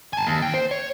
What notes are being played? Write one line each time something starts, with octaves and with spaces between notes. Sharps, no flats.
G#5 A5
D#2
D#2 G5
C5
C#5